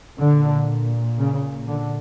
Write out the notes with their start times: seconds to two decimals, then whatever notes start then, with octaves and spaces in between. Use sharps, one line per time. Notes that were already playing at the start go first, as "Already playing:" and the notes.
0.19 A#2 D3
1.19 C#3
1.69 D3